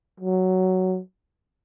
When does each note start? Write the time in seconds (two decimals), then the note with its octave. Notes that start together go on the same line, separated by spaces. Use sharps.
0.20 F#3